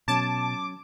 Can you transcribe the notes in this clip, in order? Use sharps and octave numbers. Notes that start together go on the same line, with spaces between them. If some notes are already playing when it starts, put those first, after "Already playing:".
B2 F#3 C#4 A5 D6 G#6